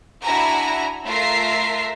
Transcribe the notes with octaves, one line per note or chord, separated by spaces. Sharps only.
D4 E4 F#4 E5 G#5 A#5
A3 F4 A#4 E5 A#5 C7